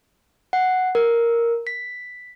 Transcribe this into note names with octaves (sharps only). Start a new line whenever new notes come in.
F#5
A#4
B6